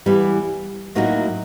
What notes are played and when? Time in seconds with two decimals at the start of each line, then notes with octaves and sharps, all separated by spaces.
0.06 E3 G3 B3
0.95 A2 F#3 A#3 D#4 F#4